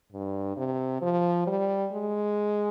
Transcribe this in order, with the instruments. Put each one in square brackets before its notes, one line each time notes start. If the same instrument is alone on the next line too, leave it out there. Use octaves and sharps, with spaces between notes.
[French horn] G2
C3
F3
G3
G#3